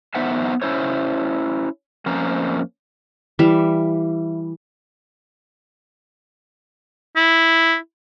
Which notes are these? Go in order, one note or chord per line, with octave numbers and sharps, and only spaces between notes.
B3 D#4 C5 E5 F#5 G#5
C#4 E4 C5 C#5
F2 A#3 C#4 C5 A#5
E3 G3 E5 F5
E4